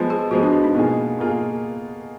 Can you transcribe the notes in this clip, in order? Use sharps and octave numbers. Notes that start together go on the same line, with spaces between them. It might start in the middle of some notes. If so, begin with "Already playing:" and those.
Already playing: F3 G#3 B3
G#4
F3 G#3 B3 F#4
D4
D4
D#4
B2 A#3 F4 G#4
B2 A#3 F4 G#4